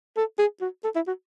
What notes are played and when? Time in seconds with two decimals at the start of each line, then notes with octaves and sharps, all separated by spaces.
0.17 A4
0.39 G#4
0.61 F#4
0.84 A4
0.95 E4
1.07 F#4